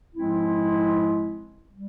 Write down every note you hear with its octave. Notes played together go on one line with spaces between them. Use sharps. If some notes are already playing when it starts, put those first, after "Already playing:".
G#2 F3 G#3 C4 E4
G3